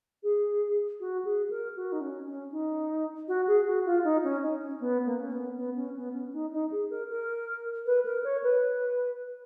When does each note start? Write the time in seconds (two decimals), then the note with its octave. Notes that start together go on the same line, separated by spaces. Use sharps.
0.23 G#4
1.00 F#4
1.24 G#4
1.50 A#4
1.76 F#4
1.92 D#4
2.01 C#4
2.26 C#4
2.52 D#4
3.28 F#4
3.47 G#4
3.66 F#4
3.85 F4
4.04 D#4
4.24 C#4
4.42 D#4
4.62 C#4
4.80 B3
5.06 A#3
5.20 C#4
5.32 B3
5.57 B3
5.76 C#4
5.96 B3
6.13 C#4
6.33 D#4
6.52 D#4
6.71 G#4
6.90 A#4
7.09 A#4
7.86 B4
8.05 A#4
8.24 C#5
8.43 B4